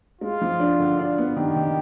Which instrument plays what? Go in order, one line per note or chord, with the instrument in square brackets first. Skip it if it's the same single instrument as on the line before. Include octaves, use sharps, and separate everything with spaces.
[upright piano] G#3 [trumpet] F4
[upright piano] F3
D4
D3
D4
B3
[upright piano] D#3 [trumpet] G4
[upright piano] D#3